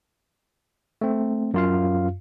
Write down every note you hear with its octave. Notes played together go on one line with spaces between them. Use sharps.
A3 C4
F#2 F4 F5